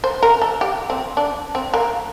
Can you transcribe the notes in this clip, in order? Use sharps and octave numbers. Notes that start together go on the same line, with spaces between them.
C5
A#4
A4
G4
C4
D4
C4
A#3